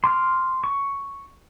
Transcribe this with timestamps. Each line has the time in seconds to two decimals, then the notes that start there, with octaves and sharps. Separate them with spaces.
0.04 C6 D6 F6
0.64 C#6